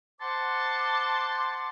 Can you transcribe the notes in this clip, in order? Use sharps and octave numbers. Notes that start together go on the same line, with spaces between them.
C5 F#5 A5 C6 D6